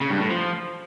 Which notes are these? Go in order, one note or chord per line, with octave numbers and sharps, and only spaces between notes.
C#3
G2
A2
F3